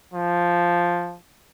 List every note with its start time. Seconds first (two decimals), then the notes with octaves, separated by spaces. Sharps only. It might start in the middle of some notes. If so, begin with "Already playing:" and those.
0.14 F3